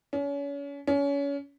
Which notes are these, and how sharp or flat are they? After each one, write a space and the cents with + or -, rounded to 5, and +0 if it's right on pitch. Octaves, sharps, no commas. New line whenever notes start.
C#4 +35
C#4 +30